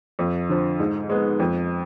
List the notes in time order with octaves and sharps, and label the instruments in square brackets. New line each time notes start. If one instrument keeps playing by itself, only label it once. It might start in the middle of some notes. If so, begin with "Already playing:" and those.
[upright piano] F2
D3 F3
G#2
G#3 B3
F2